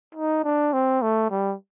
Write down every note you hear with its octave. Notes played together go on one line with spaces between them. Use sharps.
D#4
D4
C4
A3
G3